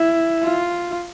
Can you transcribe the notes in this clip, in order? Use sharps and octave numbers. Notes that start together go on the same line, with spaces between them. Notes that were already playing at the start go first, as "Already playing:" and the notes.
Already playing: E4
F4